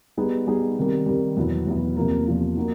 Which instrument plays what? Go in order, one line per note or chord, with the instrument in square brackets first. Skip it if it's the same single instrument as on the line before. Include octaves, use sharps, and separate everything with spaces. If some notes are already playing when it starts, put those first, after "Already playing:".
[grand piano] G3 B3 D#4 G#4
G3 B3 D#4 G#4
C3 D#3 G3
C3 D#3 G3
E2 B2 F#3 B3 E4
E2 B2 F#3 B3 E4
E2 C3 F3 A#3
E2 C3 F3 A#3
A#3 D#4 F#4